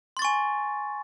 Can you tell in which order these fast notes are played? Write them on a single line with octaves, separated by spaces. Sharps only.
C6 A6 C#6 G#5